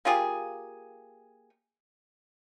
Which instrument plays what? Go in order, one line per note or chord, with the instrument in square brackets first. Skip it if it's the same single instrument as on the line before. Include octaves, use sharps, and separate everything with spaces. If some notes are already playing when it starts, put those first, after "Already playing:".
[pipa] A#3 F4 G4 G#4